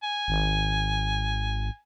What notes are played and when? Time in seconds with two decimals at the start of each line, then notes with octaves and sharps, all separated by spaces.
0.04 G#5
0.28 G#1